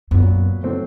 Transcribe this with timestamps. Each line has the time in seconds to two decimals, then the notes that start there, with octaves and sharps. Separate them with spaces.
0.11 F#2 A#2 F#3 B3
0.63 A2 F#3 A3 C4